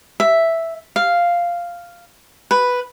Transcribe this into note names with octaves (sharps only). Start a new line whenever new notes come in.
E5
F5
B4